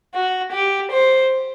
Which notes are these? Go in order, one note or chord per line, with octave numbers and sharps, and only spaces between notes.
F#4
G4
C5